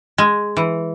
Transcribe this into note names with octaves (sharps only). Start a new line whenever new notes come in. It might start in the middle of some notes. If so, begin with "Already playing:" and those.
G#3
E3